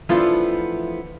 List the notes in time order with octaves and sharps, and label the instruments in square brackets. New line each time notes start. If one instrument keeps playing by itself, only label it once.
[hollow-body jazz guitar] E3 F3 A3 B3 D4 F4